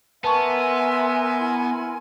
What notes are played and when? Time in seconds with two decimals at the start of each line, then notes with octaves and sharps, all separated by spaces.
0.24 B3 A#4 E5 G#5 A5 C6 C#6
1.40 E4